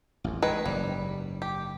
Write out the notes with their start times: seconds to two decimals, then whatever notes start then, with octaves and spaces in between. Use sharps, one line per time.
0.24 A1 F2
0.42 D#3 G#3 B4
0.66 F#1 G#2 G3
1.42 G4